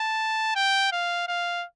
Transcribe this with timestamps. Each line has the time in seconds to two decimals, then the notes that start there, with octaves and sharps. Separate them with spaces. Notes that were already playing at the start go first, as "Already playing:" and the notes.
Already playing: A5
0.56 G5
0.92 F5
1.28 F5